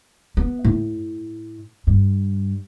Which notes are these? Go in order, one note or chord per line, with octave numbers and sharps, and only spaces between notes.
B3
A2
G2